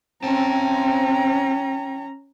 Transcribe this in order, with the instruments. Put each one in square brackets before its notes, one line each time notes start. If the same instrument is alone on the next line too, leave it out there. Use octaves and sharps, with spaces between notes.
[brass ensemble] C4 [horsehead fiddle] C#4 A#5 [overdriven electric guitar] G5 A5